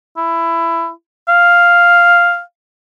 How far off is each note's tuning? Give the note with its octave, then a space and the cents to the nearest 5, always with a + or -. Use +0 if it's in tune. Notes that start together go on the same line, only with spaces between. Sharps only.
E4 +15
F5 +0